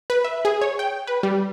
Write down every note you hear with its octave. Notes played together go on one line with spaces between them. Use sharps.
B4
E5
G#4
C#5
G5
B4
G3